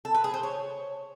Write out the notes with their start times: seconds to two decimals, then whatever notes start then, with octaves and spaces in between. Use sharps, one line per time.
0.05 A4
0.14 B4
0.24 G#4
0.34 C5
0.43 C#5